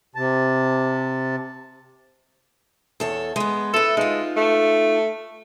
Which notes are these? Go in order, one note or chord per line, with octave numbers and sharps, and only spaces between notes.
C3 A5
E2 A4 C#5
G#3 B3
E4 A4 B4
G#3 D#4 F4
A3